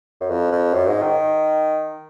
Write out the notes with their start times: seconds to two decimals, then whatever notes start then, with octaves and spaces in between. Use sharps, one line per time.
0.21 F#2
0.30 F2
0.52 F2
0.74 F#2
0.88 G#2
1.02 D#3